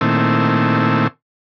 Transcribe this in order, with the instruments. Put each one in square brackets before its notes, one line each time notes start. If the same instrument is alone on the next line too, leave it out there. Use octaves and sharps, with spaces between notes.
[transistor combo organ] A#2 D#3 A3 C4 E4